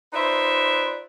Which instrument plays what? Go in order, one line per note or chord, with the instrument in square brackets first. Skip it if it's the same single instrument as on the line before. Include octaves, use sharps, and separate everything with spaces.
[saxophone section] D#4 F4 B4 C5 D5 E5